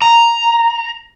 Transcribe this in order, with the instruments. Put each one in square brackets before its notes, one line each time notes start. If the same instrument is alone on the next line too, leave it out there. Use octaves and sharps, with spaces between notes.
[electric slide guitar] A#5